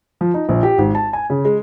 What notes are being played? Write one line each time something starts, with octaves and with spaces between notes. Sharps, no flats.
F3
D#4
A#1
G4
G#1
A5
G#5
C#3
G#3